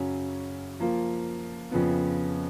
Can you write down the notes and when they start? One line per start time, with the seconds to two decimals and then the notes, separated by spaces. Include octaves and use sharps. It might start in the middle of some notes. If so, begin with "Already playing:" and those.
Already playing: F#2 C#3 F#3 C#4
0.80 F3 A#3 F4
1.71 F2 C#3 F3 B3